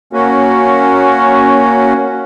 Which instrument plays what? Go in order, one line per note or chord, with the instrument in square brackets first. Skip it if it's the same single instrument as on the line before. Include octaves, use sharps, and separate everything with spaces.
[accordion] A#3 C#4 F#4